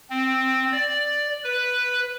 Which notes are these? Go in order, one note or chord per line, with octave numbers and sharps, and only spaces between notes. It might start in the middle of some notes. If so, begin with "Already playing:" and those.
C4
D5
B4